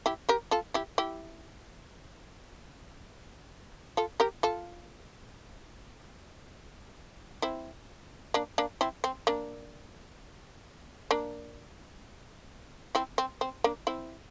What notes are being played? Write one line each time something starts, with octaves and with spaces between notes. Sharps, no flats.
E4 G4
G4 A#4
F4 A4
E4 G4
E4 G4
F4 A4
G4 A#4
F4 A4
C4 E4
A#3 D4
A#3 D4
C4 E4
C4
A#3 D4
A#3 D4
C4 E4
C4
C4
A#3 D4
C4 E4